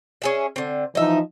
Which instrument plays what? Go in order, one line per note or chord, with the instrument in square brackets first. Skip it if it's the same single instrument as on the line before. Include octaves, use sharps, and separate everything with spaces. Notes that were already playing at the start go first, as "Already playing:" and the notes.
[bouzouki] C#4 G#4 E5
D3 C4
[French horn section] E3 F3 D#4 [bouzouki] D#5 E5